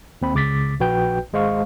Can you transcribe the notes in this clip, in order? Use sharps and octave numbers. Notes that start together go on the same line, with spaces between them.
D#2 C4 B5
C#2 C#3 D6 A6 B6
A#1 F#4 B4 G5 G6
G#1 G#3 C5 F5 C#6